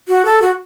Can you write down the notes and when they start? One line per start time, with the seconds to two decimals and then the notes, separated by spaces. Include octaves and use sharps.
0.08 F#4
0.25 A4
0.42 F#4